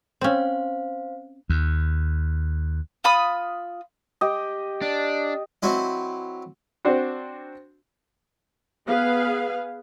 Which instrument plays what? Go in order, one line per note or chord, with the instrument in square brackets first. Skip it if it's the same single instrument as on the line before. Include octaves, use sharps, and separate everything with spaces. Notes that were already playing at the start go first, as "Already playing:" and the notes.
[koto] C4 C#4 [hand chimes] C5 F5
[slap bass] D#2
[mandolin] F4 B5 D#6
[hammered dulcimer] G4 D#5
[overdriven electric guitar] D4
[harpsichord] F#3 C4 E4 D#5
[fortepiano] C4 D4 F#4 C5
[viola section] B3 G#4 B4 F5